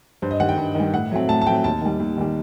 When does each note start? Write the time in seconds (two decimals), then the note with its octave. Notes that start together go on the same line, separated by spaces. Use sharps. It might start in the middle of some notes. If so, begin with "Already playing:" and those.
0.22 G2 C5
0.31 D#5
0.40 D#3 G3 F#5
0.49 G5
0.58 G2
0.75 D#3 G3
0.93 A2 F#5
1.11 F#3 A3 C4
1.28 A2 A5
1.41 A5
1.46 F#3 A3 C4 G5
1.64 D#2 A5
1.82 D#3 G3
2.00 D#2
2.18 D#3 G3